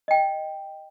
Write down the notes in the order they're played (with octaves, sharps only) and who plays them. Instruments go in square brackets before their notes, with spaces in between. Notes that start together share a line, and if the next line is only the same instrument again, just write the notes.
[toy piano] D#5 G5